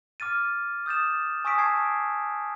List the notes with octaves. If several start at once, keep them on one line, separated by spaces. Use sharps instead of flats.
D6 F6 A6 D#7
D#6 G6 A6 E7
G#5 C#6 D#6 E6 B6 D7
A5 C#6 G#6 C7 D7